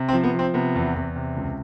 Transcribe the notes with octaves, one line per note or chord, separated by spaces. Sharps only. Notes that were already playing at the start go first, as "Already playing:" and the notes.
Already playing: C3
C4
F3
B3
F3
C4
C3 B3
E2
E2
C3
C#2